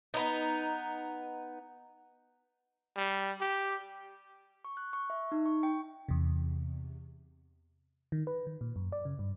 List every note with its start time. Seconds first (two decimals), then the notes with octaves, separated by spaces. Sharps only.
0.14 B3 D#4
2.96 G3
3.41 G4
4.65 C#6
4.77 F#6
4.93 C#6
5.10 E5
5.32 D#4
5.46 C#6
5.63 G5
6.09 E2 C3
8.12 D#3
8.27 B4
8.47 D#3
8.61 A#2
8.76 F#2
8.92 D5
9.05 C#3
9.19 G2